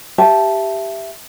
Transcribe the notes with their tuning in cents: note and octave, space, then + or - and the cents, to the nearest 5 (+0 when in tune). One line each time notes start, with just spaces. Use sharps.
G4 +0 E5 +15 A5 -10